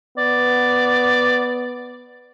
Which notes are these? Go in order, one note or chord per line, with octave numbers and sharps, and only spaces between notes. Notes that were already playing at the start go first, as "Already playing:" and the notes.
B3 D5